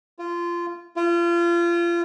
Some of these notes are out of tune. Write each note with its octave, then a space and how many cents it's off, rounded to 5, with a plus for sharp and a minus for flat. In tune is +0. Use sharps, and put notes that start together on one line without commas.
F4 -20
F4 -30